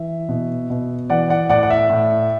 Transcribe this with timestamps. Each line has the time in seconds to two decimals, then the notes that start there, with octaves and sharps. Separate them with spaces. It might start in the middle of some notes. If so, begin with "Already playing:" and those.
Already playing: E3 E5
0.29 B2
0.70 B2
1.10 E3 D5 F#5
1.29 D5 F#5
1.50 A2 D5 F#5
1.63 F#5
1.70 E5
1.90 A2